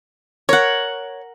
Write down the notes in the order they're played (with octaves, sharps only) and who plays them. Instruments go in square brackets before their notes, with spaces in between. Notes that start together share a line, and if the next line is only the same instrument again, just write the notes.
[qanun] A#4 F#5 [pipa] C#5